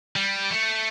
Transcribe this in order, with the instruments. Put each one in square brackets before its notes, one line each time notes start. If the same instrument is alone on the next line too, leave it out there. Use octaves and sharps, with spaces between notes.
[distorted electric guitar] G3
A3